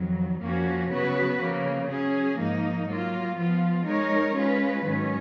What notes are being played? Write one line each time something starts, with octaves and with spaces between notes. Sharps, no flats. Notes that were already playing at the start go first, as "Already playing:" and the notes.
Already playing: F2 D#3 F#3
F2 F3 A#3 C#4 F#4
C#3 F#3 B3 F#4 B4
C#3 F3 A#3
F#3 C#4 G#4
G#2 F3 A#3 D#4
F#3 A#3 F4
F3 B3 F4
G#3 D#4 A#4 C#5
G#3 C#4 F4 B4
G#2 D#3 F#3 C#4